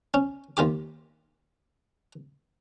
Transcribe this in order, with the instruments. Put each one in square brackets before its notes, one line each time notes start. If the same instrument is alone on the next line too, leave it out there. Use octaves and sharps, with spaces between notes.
[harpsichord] C#4
D#2 F4 G4 D6